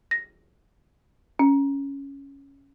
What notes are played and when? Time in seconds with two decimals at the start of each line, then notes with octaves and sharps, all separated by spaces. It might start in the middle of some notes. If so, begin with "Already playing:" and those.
0.11 A#6
1.39 C#4